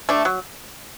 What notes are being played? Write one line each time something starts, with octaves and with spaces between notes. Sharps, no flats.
A3 D4
F#3